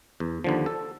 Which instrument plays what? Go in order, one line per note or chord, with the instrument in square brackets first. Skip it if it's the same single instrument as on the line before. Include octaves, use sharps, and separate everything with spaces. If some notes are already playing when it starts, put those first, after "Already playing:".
[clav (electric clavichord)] E2
D#2 D3 F3
A4